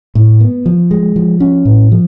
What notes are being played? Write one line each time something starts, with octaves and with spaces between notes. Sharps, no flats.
A2
B3
F3
G#3
F3
C#4
A2
F3